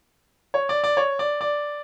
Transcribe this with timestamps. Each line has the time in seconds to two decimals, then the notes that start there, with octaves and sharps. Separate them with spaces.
0.54 C#5
0.69 D5
0.84 D5
0.97 C#5
1.19 D5
1.41 D5